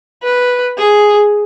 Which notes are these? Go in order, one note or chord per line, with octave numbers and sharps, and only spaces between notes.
B4
G#4